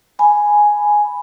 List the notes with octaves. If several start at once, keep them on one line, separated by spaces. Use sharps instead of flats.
G#5 B5